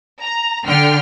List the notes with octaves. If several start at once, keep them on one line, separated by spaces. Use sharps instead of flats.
A#5
D3 G5 F6